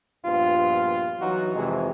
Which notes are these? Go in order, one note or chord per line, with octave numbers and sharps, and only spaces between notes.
A#1 G2 B3 F4
E3 F#3 D#4 F#4
F2 C3 E3 G#3